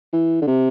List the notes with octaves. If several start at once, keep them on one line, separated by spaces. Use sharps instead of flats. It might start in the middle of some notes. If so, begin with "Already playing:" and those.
E3
D3
C3